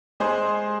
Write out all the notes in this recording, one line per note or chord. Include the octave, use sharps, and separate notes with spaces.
G#3 G#4 C5